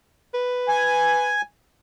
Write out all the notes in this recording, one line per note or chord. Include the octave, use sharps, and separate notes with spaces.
B4
G#5